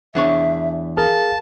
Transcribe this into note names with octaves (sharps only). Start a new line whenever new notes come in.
E2 D4 C#5 E5
G#4 A#4 F5 A5